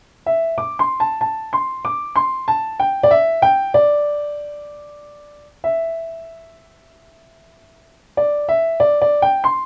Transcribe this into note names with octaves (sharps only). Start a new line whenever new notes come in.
E5
D6
C6
A5
A5
C6
D6
C6
A5
G5
D5
E5
G5
D5
E5
D5
E5
D5
D5
G5
C6